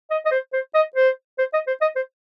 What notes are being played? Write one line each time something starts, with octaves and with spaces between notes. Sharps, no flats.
D#5
D#5
C5
C5
D#5
C5
C5
D#5
C5
D#5
C5